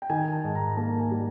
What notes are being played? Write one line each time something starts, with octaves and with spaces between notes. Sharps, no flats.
G5
D#3 G#5
A5
G#2
A#5
A#3 A5
G#5
G3